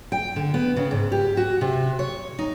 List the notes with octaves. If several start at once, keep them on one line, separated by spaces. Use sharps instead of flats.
G5
D3
B3
C#3
G#2
G4
F#4
C3
C#5
D#4